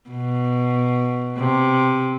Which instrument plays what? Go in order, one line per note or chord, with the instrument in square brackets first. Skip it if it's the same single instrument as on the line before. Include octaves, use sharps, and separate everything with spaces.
[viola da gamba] B2
C3